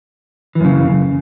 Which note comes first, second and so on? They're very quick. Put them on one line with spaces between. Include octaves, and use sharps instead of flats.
E3 F#2 C#3